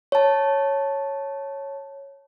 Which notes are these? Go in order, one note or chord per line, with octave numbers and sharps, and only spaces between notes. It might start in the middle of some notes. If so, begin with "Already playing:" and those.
C#5 A5